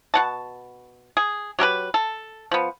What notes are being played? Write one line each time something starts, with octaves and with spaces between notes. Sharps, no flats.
B2 F#5 A5
G#4
F#3 G4 A#4 B4
A4
F3 B3